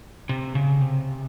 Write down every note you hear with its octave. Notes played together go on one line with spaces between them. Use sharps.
C3
C#3
C3